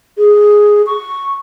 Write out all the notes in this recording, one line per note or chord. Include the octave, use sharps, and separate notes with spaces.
G#4
C#6